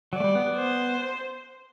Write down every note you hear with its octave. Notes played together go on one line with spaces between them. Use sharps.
F#3 D5
A3
G3
B3
B3
C5